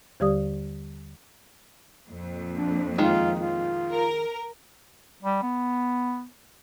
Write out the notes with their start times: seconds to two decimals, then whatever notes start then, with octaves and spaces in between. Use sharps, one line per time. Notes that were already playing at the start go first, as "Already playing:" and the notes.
0.20 D#2 D3 G3 G4 D5 D#6
2.10 F2 A#2
2.58 D4
2.98 D#3 G#3 F4
3.39 F4
3.91 A#4
5.23 G3
5.43 B3